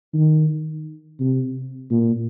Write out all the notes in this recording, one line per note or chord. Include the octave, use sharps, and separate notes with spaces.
D#3
C3
A#2